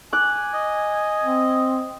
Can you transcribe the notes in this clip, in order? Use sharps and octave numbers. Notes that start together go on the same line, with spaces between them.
G#5 D6 F#6
D#5
C4